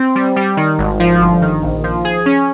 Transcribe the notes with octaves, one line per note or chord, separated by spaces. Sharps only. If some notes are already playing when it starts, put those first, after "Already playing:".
Already playing: C4
G3
G3
D#3
G#1
F3
G1
D#3
A#1
F3
G#4
C#4